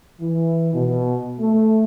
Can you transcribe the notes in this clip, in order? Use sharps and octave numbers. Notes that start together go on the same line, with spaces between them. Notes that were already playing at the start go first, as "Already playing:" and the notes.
E3
B2
A3